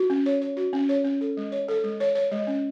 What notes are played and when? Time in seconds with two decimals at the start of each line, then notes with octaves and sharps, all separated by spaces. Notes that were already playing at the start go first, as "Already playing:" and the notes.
Already playing: F#4
0.10 C#4
0.26 C#5
0.41 C#5
0.57 F#4
0.73 C#4
0.89 C#5
1.04 C#4
1.21 A4
1.37 G#3
1.52 C#5
1.68 A4
1.84 G#3
2.00 C#5
2.15 C#5
2.32 G#3
2.47 C#4